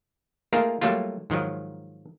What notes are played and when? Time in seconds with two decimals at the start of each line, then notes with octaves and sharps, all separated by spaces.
0.53 A3 A#3 D#4 F4 G#4 A#4
0.81 F#3 G3 A3 A#3 F4
1.30 G#2 D#3 F3 F#3